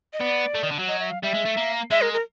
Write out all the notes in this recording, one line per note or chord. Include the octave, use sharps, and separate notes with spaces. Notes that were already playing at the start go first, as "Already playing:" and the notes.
D#5
B3 D5
A3
D#3
D3
F#3
D#5
E5
F5
G3 E5
G#3
A3
A#3
G#3 E5
A#4
A#4